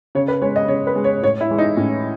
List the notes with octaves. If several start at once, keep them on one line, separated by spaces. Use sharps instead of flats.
C#3 C#5
B4
G#3 C#5
D#5
C#3 C#5
B4
G#3
C#5
A2 C#5
E4
E3 G#3
D#4
A2 C#4